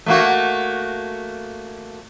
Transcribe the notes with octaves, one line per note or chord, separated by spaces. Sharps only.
A3 A#3 F#4